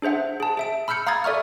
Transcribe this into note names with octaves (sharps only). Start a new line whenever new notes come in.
D4 G#4 C5 E5 F#5
G#4 A5
G#4 E5 D7
B5 E6 F6 G6 C#7
F5 A#5 B5 D#6 G#6 A6
A4 D5 E5 C#6 F6